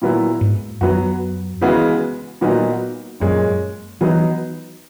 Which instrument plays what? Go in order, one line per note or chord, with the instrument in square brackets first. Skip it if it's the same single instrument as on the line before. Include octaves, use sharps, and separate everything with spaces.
[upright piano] A#2 F#3 B3 E4
[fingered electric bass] G#2
[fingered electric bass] F#2 [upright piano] F#3 B3 F#4
[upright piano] C#3 E3 G#3 B3 F#4
A#2 F#3 B3 D#4 F#4
[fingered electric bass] F#2 [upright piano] A#2 G#3 C#4
[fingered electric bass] E3 [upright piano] F#3 B3 D#4